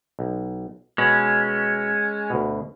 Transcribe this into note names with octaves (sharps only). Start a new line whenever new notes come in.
B1
B2 G#3 C#4
D2 B2